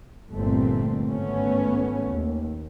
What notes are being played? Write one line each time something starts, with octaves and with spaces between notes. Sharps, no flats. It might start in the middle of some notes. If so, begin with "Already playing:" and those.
G1 A#2 A3 C4
G#1 A3 B3 C#4
D#2